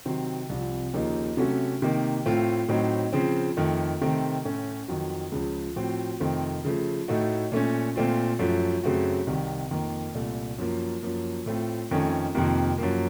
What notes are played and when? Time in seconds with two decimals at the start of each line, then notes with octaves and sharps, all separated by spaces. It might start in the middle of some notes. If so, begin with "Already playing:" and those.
0.05 C3 D#3 F#3 C4
0.49 C2 C3 F3
0.94 D#2 C#3 F3 A#3 D#4
1.37 C3 F#3 A3 C#4 F#4
1.82 C3 D#3 A#3 D#4
2.26 A2 A3 C4 F4
2.69 A2 F#3 C4 D#4
3.13 C#3 F3 C4
3.57 F2 D#3 A3
4.01 C3 D#3 A3 C4
4.45 A2 A3 C#4
4.88 F2 D#3 F#3
5.32 C#2 C#3 F3
5.76 A2 F3 C4 F#4
6.20 F2 C3 D#3 A3 C4
6.65 C#3 F3 A3
7.08 A2 A3 D#4 F#4
7.52 A#2 A3 C#4
7.96 A#2 A3 C4 F4
8.39 F#2 F3 A3
8.83 F#2 C#3 A3 C4 F#4
9.27 C2 C3 D#3
9.71 F2 D#3 A#3
10.14 C2 A#2 A3
10.58 F#2 F3 A#3
11.03 F#2 F3 A#3
11.46 A2 A3 C4 F4
11.91 F2 D#3 A3 C#4
12.35 F2 C3 D#3 A#3
12.78 F#2 F3 A#3